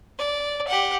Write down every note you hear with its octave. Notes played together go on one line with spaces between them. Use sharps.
D5
G4 F#5